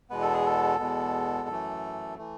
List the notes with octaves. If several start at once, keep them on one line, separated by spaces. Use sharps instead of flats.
E2 B2 G#3 B3 B4
A4
G#4
A4
E2 B2 G#3 B3
F#2 E3 A3
E3 A3